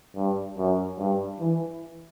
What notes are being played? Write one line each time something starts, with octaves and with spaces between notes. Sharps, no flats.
G2
F#2
G2
E3